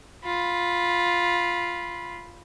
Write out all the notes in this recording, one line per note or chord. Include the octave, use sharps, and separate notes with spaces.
F4 B5